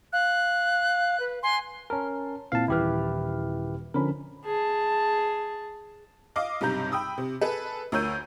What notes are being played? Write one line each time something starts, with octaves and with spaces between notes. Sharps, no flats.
F5 F#6
B4
G#5 C6
C#4 A#4 A5
A#2 C4 E4 F5 A5
D#1 E3 E4 G4 B4 F6
D3 F3 C#4 A#4 B5
G#4 A5
D#5 F5 D6
B1 G2 C3 A#5 G6
G5 B5 D#6 E6
C3
G#4 A4 B4
D2 A#4 C#5 E6 G6 D#7